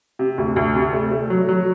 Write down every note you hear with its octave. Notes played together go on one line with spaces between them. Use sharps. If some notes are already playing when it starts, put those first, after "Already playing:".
C3
D2
D2
C3
A3
A3
F#3
F#3